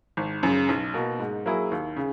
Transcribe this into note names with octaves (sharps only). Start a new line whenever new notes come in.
G#1
F#2 C#3
B1
B2 A#3
G#2
F#3 A#3 E4 G#4
D#2
C#3